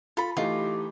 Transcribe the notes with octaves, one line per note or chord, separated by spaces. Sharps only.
F4 A4 B5
E3 A3 D#4 F4 G4